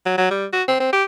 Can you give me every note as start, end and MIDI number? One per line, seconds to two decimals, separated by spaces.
0.06 0.16 54
0.18 0.29 54
0.31 0.46 55
0.53 0.63 66
0.68 0.75 60
0.80 0.88 60
0.92 1.04 67